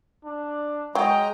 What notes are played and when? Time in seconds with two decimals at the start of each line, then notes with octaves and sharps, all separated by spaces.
0.25 D4
0.95 F#3 G#3 D#5 G5 A#5